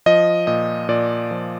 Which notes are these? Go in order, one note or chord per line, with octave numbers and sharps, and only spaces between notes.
F3 D#5
A#2 D#5
A#2 D5
F3